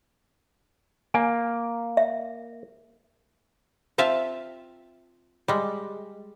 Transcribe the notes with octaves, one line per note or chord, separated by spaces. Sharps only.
A#3 G#5
E5
C4 F4 E5 F5 A5
G3 G#3